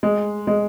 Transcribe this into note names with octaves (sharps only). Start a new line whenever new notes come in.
G#3
G#3